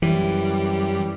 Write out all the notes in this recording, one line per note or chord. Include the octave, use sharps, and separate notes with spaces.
F#2 E3 G3 G4